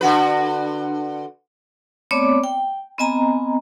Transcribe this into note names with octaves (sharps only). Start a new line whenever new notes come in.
D3 F#4 B4
A3 B3 C4 C#5 D5 D6
G5
B3 C4 D#5 G#5 A#5